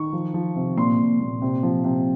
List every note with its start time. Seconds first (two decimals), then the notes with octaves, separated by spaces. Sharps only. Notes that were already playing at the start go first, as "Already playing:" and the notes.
Already playing: D#3 C#6
0.13 F3
0.34 F3
0.56 C3
0.77 A#2 C6
0.99 A#2
1.20 A#2
1.42 C3
1.63 F3
1.84 C3